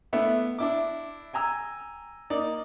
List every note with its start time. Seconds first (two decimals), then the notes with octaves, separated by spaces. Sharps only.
0.13 A3 B3 D4 E4
0.59 D4 E4 D6
1.33 G5 G#5 A#5 E6
2.30 A#3 D#4 D5